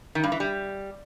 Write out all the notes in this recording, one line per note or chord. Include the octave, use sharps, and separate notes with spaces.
D#3
G2
E3
G3